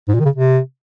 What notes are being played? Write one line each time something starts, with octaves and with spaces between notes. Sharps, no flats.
G#2
A#2
D#3
C#3
C3